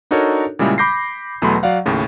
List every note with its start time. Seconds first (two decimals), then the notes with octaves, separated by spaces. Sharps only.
0.11 D4 D#4 F#4 A4 A#4 C#5
0.59 A#2 C#3 G3 G#3 E4
0.78 B5 D6 G6 A#6 C7
1.42 E2 B2 F#3 A3 B5 C6
1.63 F#3 D5 F5 F#5
1.86 D#2 A2 C#3